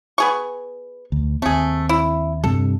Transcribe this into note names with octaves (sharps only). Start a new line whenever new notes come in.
B3 G#4 C#6
D2
D#2 A3 C4 G#4
E4
G2 C3 G3 A4